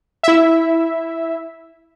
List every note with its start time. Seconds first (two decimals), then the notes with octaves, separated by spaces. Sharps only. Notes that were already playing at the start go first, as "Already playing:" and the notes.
0.23 E4 E5